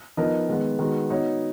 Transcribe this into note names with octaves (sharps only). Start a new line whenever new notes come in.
F3 B3 D#4 A#4 D#5
D#3 G#3 B3
D#3 G#3 B3 F#4
B3 D#4 F#4 C#5